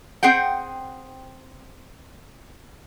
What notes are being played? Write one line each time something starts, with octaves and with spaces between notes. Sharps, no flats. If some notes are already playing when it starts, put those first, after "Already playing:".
C4 G#4 F#5 G5